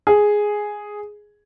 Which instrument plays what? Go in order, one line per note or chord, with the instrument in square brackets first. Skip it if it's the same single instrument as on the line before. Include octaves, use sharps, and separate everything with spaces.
[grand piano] G#4